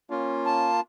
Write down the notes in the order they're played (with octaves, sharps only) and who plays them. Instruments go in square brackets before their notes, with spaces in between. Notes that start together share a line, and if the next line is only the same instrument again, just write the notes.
[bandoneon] A#3 F4 [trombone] C#4
[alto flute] A5